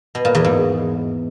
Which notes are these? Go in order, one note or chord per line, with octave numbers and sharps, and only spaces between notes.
B2
A#2
E2
G#2